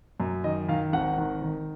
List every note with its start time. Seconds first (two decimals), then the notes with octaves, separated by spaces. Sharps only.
0.20 F#2
0.44 D#3 D#5
0.68 D#3 F5
0.93 G#1 F#5
1.18 D#3
1.42 D#3